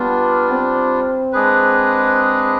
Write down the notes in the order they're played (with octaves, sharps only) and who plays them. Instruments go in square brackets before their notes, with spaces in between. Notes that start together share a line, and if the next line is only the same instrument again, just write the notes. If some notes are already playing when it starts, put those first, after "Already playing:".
Already playing: [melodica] G3 D4 F4 [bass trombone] B3
[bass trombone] C4
[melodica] G#3 D4 G#4 B4